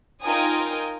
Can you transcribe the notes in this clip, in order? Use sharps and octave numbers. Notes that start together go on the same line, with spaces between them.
D#4 F4 A#4 G5 G#5 D#6